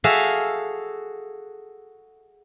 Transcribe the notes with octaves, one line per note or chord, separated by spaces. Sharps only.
F#4 G#4 A4 E5 F5